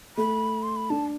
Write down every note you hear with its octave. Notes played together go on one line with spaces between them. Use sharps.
A3 B5
C6
B5
D4 A5